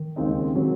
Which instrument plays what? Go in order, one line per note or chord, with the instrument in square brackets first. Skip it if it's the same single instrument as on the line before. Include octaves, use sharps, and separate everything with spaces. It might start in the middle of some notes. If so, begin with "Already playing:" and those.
Already playing: [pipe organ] D#3
[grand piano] D#2 C#3 G#3 C4 D#4
C3 F#3 C4